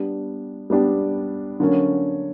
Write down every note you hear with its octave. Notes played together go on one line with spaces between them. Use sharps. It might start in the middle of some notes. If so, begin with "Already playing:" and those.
Already playing: G3 B3 D4 G4
G3 B3 D4 G4
D3 F#3 A#3 C#4